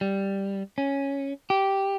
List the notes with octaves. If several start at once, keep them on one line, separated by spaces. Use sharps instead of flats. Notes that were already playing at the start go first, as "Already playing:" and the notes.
G3
C#4
G4